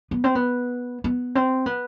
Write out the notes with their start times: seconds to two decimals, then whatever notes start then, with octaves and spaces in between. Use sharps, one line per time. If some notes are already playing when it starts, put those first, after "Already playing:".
0.11 B3
0.24 C4
0.35 B3
1.04 B3
1.35 C4
1.66 B3